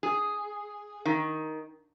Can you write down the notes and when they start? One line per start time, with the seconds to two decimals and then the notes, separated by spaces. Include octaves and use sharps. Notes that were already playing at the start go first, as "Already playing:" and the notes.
0.03 G#4
1.05 D#3